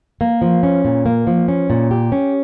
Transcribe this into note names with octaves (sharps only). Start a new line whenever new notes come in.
A#3
F3
C#4
A#2
A#3
F3
C#4
A#2
G4
C#4